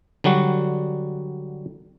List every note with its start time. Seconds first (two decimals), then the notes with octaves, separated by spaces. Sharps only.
0.24 D3 F#3 G3 F#4